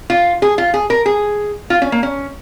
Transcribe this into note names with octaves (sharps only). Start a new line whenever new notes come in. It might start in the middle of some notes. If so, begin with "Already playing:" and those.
F4
G#4
F4
G#4
A#4
G#4
F4
C#4
A#3
C#4